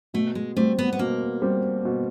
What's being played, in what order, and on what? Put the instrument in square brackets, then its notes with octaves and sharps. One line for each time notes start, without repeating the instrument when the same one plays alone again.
[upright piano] B2 [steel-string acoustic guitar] A3
[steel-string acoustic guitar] G#3
[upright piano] G3 C4 [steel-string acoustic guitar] A3
[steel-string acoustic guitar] B3
B3
[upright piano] B2 [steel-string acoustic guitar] A#3
[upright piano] G3 C4
B2